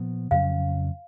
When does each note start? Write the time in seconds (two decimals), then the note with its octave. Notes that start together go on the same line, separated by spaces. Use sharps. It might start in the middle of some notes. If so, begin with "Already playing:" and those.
Already playing: A#2 F3 B3
0.31 F2 C#3 F#3 C#4 F5